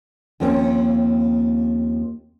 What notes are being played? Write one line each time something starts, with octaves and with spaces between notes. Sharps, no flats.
D#2 F3 A#3 C4 C#4